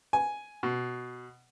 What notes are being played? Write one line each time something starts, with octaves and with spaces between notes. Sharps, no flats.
G#5
B2